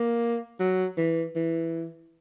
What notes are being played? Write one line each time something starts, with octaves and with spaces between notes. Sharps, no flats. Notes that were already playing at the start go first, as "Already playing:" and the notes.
Already playing: A#3
F#3
E3
E3